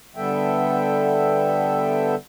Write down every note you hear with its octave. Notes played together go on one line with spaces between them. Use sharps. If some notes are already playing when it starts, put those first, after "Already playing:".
D3 G3 B3 A4 E5 G5